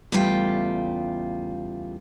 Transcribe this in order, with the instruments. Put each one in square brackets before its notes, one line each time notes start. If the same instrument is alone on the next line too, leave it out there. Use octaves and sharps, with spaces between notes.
[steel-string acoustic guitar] E2 C#3 G3 A3 F4 G5